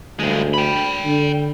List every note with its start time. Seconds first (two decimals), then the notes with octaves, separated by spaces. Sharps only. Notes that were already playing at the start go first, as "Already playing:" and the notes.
0.19 D2 G2 G#3
0.54 G5 B5
1.05 D3